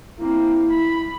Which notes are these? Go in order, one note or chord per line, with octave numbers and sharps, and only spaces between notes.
A#3 C4 E4
B5